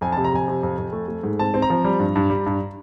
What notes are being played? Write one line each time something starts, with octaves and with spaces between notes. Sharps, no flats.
F2 G#5
C3 A5
A#5
F2 G#5
C3
F2
F2
A3
A3
G#2
C4 A5
C4
A#5
F3
G3
G2
G2
G3
G2